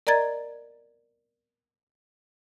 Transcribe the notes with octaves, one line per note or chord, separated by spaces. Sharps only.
A#4 D5 D#5 A#5 G#6 A6